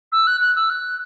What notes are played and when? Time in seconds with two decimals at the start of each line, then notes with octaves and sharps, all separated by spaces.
0.12 E6
0.27 F#6
0.41 F#6
0.56 E6
0.70 F#6